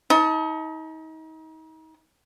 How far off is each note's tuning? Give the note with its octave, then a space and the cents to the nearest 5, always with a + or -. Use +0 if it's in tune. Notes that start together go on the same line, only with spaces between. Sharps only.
D#4 +35 A5 +0 D#6 +35